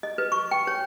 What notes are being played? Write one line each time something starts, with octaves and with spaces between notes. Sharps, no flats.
D#5
B4
C#6
G5
C#5